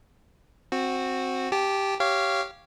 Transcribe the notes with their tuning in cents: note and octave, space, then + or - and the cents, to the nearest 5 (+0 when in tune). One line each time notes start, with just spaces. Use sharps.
C4 +10 F#4 -10
G4 +0 A5 -25
G4 -10 C#5 +0 F5 -15